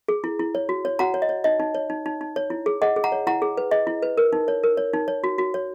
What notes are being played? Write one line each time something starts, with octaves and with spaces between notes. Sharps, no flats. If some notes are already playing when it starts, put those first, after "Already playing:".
G#4
E4
E4
C#5
F#4
C#5
F#4 F#5 A#5
C#5
D#5
C#5
D#4 D#5
D#4
C#5
D#4
D#4
D#4
C#5
E4
G#4
G#4 D#5 F#5
G#4
F#5 A#5
C#5
E4 F#5 A#5
G#4
B4
G#4 D#5
E4
B4
A#4
D#4
C#5
A#4
C#5
D#4
C#5
F#4
F#4
C#5